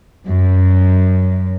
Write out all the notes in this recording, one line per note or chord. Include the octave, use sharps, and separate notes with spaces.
F#2